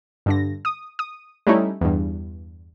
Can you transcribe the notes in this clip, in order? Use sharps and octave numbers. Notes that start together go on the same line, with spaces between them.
G2 D3 A#6
D#6
D#6
G3 A3 C#4 D#4 E4
E2 G2